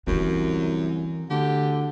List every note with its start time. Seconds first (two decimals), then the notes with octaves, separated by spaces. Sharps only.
0.07 C2 F#2 D3 E3
1.30 D2 D3 G4